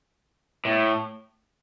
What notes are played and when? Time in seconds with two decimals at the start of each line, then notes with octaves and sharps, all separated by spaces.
0.65 A2